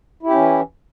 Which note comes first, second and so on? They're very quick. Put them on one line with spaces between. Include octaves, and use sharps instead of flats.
E4 G4 C#4 E3